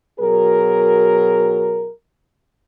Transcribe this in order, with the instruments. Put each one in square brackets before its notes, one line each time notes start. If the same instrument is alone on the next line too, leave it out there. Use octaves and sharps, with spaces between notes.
[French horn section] B2 F#3 G#4 A#4